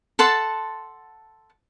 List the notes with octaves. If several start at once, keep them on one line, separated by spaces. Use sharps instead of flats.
A4 F#5 A5 C6